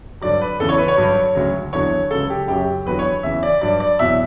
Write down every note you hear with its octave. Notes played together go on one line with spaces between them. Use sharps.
G2 D3 F#3 D5
B4
E2 C#3 E3 A4
C#5
B4
C#5
G2 D3 F#3
D2 C#3 F#3
E2 D3 F#3 C#5
C#2 C#3 F#3 A4
G4
F#2 C#3 F#3 G4
E2 D3 F#3 B4
C#5
E2 C#3 E3 E5
D5
G2 F#3 D5
D5
E2 B2 F#3 E5